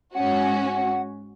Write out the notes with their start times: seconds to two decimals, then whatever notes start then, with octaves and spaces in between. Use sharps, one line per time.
0.14 G#2 C#4 F#4 F#5